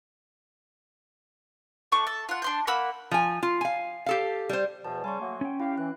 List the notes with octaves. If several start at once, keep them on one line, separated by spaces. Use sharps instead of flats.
A3 D4 C#6
A4
F4 F#5
D4 C6 G6
A#3 F#5 B5 E6
F3 G#5
F4
F5 G#5
G4 A4 F5
G3 C5
E2 B2 F3 A5
C#3 G3 G#5 C6 C#6
F#3 A3 A#3
C#4 G5
E4 G4 F5
E3 F#6